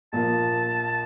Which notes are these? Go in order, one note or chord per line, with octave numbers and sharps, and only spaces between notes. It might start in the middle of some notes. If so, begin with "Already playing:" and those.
A#1 A#2 F3 A#3 A5